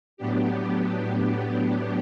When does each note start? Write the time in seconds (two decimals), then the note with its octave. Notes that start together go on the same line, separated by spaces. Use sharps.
0.17 A2 F#3 B3 D4 G4